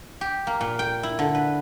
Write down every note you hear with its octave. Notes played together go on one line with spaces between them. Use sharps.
G4
A#3
A#2
G5
E4
D3
B4